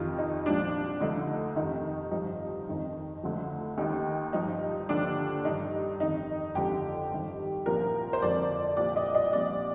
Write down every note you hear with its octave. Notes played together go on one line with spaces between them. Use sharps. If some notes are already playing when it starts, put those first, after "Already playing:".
Already playing: F2 C3 D#3 F4
D#4
C2 A#2 F3 D4
D2 D3 F3 D#4
F2 C3 D#3 D#4
G2 F3 D#4
F2 D#3
D2 D3 F3
D#2 D#3 D#4
G2 F3 D#4
D#2 D3 F3 D4
G2 D#3 D#4
F2 D#3 D#4
F2 D3 F3 G4
G2 D#3
C2 A#2 F3 A#4
C5
F2 D3 F3 D5
C2 A#2 F3 D5
D#5
D#5
C2 A#2 F3 D5